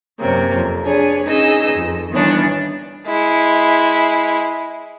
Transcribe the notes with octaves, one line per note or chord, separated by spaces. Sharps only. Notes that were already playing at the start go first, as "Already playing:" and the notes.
F#2 C3 A#3 C#4
F2
D4 G#4 B4 C#5 G#5
C#4 D#4 G#4 B4 D#5 E6
F2
D#3 E3 G3 B3 C#4 D4
G#3 E4